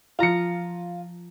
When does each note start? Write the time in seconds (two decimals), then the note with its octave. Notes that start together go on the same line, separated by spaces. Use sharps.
0.19 F3 F4 A#5 F6 C#7